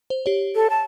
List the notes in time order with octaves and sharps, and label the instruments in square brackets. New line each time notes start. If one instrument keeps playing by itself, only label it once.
[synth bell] C5
G4 C#5
[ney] A4
A5